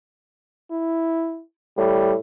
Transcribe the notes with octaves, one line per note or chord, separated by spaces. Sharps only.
E4
A2 G3